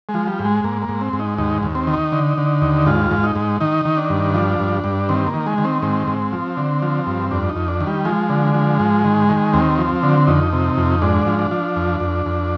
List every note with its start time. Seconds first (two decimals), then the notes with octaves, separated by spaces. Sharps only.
0.09 G#3
0.14 F3
0.27 G3
0.39 G#2
0.45 G#3
0.64 G#2 A#3
0.82 A#3
0.89 G#2
1.01 C4
1.13 G#2
1.20 D#4
1.38 D#2 D#4
1.63 D#2
1.75 C4
1.87 D#3
1.93 D#4
2.12 D3
2.37 D3
2.61 D#2
2.86 G#2 F4
3.11 G#2
3.24 D#4
3.36 G#2
3.60 D#3 D#4
3.85 D#3
3.97 D4
4.10 G2
4.34 F3
4.60 G2
4.84 G2
5.09 D#3 C4
5.27 A#3
5.34 D#3
5.46 G#3
5.58 D#3
5.64 C4
5.82 G#2 C4
6.07 G#2
6.32 F3
6.57 D3
6.82 F3
7.06 G2
7.31 F2 D4
7.49 D#4
7.56 F2
7.68 D4
7.81 D#3
7.87 G3
8.05 F3 G#3
8.29 D3
8.54 F3
8.79 G#2
9.04 D#3
9.29 D#3
9.53 D#2 C4
9.78 F3
10.03 D3
10.27 F2 D#4
10.53 C3
10.77 F2
11.02 G#2 D4
11.27 F3
11.39 D4
11.51 F3
11.76 F2
12.00 F2
12.26 F2